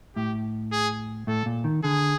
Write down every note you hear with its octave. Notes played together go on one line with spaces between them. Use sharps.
A2 G4
G#4
A2 A4
A#2
D#3
D3 G#4